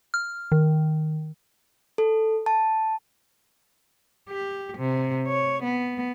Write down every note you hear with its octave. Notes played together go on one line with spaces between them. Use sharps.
F6
D#3
A4
A5
G4
C3
C#5
B3